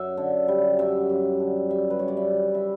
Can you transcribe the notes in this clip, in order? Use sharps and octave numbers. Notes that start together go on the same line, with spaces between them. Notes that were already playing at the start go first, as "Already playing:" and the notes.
Already playing: F#2 E5
D3
G3
F#2 E5
F#2
D3
G3 E5
B4
C#3 C#5
D5
E5
E3
E5